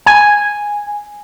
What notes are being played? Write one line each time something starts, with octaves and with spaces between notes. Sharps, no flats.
G#5